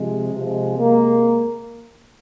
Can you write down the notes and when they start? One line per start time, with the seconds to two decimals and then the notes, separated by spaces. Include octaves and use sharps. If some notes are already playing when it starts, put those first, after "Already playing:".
Already playing: C3 F3 G#3
0.34 C3 F3 G#3
0.78 C3 G#3 A#3